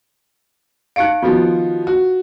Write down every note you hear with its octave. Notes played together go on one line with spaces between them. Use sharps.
D#4 G4 F5 F#6 C#7 D7
D#3 F3 B3 F4 F#4
F#4